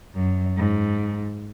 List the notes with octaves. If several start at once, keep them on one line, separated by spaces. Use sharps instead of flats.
F#2
G#2